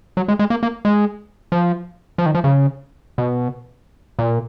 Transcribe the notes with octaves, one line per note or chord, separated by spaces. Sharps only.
F#3
G#3
G#3
A#3
A#3
G#3
F3
F3
D#3
F3
C#3
B2
A#2